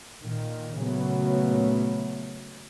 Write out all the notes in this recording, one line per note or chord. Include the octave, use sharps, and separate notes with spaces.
A#2 D#3
A#2 C#3 F#3 A3 B3